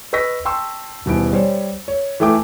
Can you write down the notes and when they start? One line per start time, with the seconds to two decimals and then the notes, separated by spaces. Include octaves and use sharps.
0.13 B4 D#5 C#6 E6 A#6 B6
0.45 G5 A5 C6 C#6 E6
1.06 D#1 B2 E3 D7
1.33 G3 C5 C#5
1.88 C#5
2.20 E3 A3 G5 D6